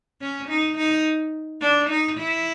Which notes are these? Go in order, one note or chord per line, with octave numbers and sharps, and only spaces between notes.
C#4
D#4
D#4
D4
D#4
E4